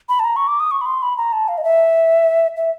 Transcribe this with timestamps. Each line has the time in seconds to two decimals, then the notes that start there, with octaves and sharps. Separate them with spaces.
0.09 B5
0.20 A5
0.24 A#5
0.36 C#6
0.48 D6
0.60 D#6
0.71 C#6
0.81 B5
0.86 C6
1.02 B5
1.17 A#5
1.33 A5
1.48 F5
1.58 D#5
1.64 E5
2.56 E5